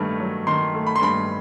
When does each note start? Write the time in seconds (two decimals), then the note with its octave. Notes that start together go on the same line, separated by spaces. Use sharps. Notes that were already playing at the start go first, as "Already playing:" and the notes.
Already playing: G2 D#3 A3
0.20 F#3
0.47 D#3 C6
0.74 A3
0.87 B5
0.96 C6
1.01 G2 B5